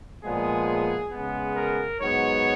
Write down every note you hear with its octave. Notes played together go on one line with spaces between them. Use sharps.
A#2 F3 G#3 B3 G#4
C#3 G#3 B3
A#4
G#2 F#3 B3 C#5